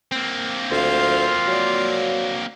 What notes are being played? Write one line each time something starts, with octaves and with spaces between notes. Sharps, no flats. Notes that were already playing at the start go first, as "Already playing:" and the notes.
A#3 C4
D2 F4 C5 F5
F#3 D5